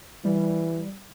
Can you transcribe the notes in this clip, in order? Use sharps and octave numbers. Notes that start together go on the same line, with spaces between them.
E3 G3